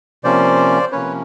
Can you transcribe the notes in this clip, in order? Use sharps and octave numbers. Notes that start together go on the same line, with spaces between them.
C3 F3 A#3 C#4 C5 D5
C3 F3 A#3 C#4 B4 C#5